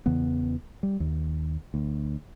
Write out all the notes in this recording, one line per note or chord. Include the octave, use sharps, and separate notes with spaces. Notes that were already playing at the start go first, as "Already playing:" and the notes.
E2 C#3 E3 B3
G3
D#2
D2